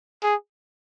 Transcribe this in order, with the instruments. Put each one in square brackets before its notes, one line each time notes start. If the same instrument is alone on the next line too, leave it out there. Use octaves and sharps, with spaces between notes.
[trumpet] G#4